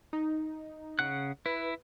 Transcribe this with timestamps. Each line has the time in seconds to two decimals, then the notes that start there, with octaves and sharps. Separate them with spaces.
0.13 D#4
0.99 C#3 F#5 F#6
1.46 E4 B4